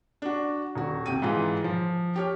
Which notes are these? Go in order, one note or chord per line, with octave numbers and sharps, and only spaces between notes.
D4 F#4
D#1 F#4
C3 G5 D#7
G#2 E3 F4
F3
G4 C#5 F6